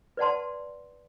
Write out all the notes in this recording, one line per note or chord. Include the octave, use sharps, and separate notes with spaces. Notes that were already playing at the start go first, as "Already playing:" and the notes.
B4 D5 F#5 A5 C6